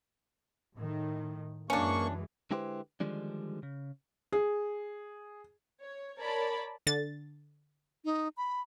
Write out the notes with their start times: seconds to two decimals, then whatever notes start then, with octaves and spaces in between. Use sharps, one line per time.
0.76 A2 D#3
1.70 F#2 E3 G#3 A#3 C#4 D4 C#6
2.51 D3 G#3 E4 G4 B4 C5
3.00 D3 D#3 F3 G3 G#3 D4
3.63 C#3
4.33 G#4
5.81 C#5
6.19 A#4 C#5 D5 A5 B5
6.87 D3 A6
8.05 D#4
8.37 B5